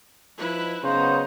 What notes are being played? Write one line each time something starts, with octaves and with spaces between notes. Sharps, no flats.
F3 D#4 E4 B4
C#3 F#3 B3 D#4 C5